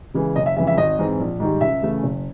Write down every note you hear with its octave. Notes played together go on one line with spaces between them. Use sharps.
C#3 E3 G#3
F#1 D#5
E5
F2 C#3 E3 G#3 E5
E5
G#1 D#5
G#2 E3 G#3 C4
A#1
G#2 D#3 G3
C#2 E5
C#3 E3 A3 C#4
F#1